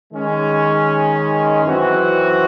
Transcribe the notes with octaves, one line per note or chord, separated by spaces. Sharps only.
D#3 G#3 C#4
F#2 E3 C4 F#4